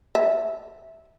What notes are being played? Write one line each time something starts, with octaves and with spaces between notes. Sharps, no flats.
E5